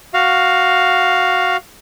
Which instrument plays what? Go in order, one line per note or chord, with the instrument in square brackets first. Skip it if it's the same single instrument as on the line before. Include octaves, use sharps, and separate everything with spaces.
[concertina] F#4 F5